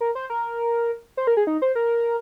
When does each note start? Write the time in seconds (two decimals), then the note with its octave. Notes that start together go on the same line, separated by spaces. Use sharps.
0.01 A#4
0.15 C5
0.30 A#4
1.17 C5
1.27 A#4
1.37 G#4
1.47 D#4
1.62 C5
1.75 A#4